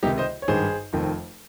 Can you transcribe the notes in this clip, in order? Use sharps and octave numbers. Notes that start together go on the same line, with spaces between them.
C#2 C3 D#3 D#4 G4
C5 D#5
C#5
G#1 G2 D#3 G#4 C5
F1 F2 D#3